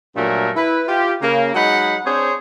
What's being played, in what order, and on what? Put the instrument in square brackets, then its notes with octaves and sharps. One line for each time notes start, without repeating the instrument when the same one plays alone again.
[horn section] G2 A#2 F#3 A3 A#4
E4 B4
F4 G4
C#3 A#3
F#3 G#3 D#4 F#5 B5
C4 D4 G#4 C5 C#5